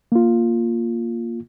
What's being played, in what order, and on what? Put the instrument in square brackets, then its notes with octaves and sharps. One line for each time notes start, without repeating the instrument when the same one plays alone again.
[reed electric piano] A#3 F4